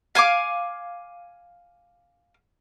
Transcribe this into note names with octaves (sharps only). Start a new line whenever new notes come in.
F5 G#5 C6 D6